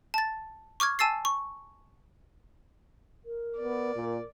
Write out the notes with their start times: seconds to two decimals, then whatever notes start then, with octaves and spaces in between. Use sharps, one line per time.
0.14 A5 A6
0.80 C#6 D6 F6 G#6
0.99 G#5 A5 E6 A6 C7
1.25 C#6
3.25 A#4
3.58 B3 D5
3.96 A#2